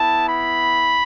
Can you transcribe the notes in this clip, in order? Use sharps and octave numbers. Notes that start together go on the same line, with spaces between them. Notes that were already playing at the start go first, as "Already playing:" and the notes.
Already playing: B3 E4 A5
B5